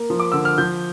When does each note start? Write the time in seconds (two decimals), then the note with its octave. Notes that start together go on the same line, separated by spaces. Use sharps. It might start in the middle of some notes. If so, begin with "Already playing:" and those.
Already playing: A#3
0.10 F3
0.20 D6
0.32 D3 E6
0.45 F6
0.58 F3 G6